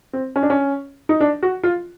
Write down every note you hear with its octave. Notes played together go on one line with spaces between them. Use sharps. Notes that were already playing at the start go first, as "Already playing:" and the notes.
C4
C#4
D4
C#4
D#4
D4
F#4
F4